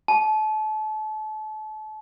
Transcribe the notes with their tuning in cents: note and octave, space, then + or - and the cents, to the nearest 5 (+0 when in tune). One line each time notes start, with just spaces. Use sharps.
A5 -35